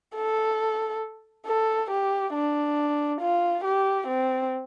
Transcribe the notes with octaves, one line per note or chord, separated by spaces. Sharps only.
A4
A4
G4
D4
F4
G4
C4